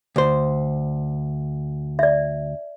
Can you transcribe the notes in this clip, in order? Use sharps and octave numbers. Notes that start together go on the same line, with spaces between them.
D2 C5
D5 E5